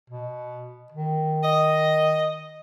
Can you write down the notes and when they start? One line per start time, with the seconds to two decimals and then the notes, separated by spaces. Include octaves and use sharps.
0.10 B2
0.92 D#3
1.44 D#5